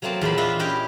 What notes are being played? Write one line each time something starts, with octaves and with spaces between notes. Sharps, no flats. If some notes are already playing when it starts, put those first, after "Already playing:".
F#3 A3 A#3 C4 A5
E2 A#2 C5 B5
D4 F4 D#5 E5 F#5
C#4 E4 G4 D#5 G5